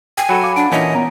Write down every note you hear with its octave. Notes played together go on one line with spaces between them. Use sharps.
G5 G#5
F#3 F#4 A4 B5
F5 D6
D4 F#5 A5 D7
A#2 E3 C#4 E4 D#5
B3 A#5